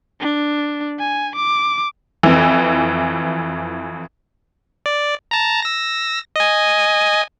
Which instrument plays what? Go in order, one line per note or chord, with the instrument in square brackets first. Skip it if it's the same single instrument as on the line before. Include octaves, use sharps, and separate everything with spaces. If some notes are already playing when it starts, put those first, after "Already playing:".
[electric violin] D4
G#5
D6
[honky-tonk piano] F2 E3
[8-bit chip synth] D5
A5 A#5
E6 A#6
D#5 G#5